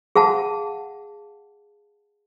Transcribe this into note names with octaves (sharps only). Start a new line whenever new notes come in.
G#4 F5 F#5 A5